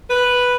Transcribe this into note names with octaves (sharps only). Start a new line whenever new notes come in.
B4